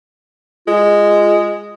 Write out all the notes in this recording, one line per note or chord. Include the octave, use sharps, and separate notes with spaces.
G#3 F4